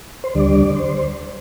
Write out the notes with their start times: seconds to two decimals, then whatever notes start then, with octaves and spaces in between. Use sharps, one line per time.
0.24 C5
0.35 D2 D3 G3 D5
0.75 C5